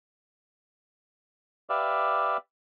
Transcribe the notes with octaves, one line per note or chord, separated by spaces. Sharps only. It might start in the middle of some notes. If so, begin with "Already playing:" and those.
G4 B4 D5 E5 F5